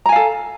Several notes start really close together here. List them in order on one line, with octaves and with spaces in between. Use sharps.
A#5 G#5 F5 A4